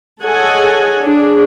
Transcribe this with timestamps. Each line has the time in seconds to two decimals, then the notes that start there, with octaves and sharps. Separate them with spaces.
0.23 G#4 A4 C#5 D#5 F#5 G#5
1.01 D4 G#4